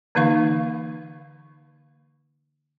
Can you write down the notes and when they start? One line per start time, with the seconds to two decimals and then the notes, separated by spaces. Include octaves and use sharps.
0.15 D3 E3 A#3 D#4 F5 C#6